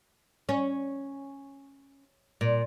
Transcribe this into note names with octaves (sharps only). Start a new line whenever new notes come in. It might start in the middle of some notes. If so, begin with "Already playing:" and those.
C#4
A#2